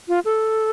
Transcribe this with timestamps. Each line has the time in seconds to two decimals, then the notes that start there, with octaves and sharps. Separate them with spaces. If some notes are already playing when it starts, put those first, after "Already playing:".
0.08 F4
0.25 A4